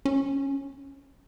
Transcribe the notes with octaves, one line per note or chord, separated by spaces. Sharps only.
C#4